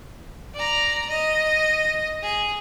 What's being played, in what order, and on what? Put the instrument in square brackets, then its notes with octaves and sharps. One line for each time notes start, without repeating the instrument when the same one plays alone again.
[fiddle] D5 A#5
D#5
G#4